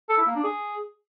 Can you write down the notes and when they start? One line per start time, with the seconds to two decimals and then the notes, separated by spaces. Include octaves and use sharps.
0.09 A4
0.18 E4
0.27 A#3
0.35 D4
0.44 G#4